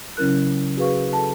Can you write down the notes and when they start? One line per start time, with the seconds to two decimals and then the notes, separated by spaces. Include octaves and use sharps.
0.17 C#3 F#3 C#4 E4 A#4 F#6
0.77 F#4 G#4 B4 F5 C#6
1.13 A4 A5